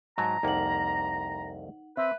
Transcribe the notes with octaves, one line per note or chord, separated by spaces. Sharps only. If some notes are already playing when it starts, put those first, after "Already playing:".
G#2 F#3 A5 A#5
C2 F2 A#3 D#4 F#5 F#7
C4 B4 E5